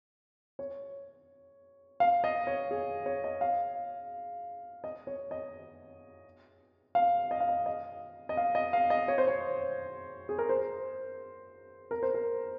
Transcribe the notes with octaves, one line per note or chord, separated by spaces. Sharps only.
C#5
F5
D#5
C#5
G#4
C#5
D#5
F5
D#5
C#5
D#5
F5
D#5
F5
D#5
D#5
D#5
F5
D#5
F5
D#5
C#5
C5
C#5
G#4
A#4
C5
A#4
C5
A#4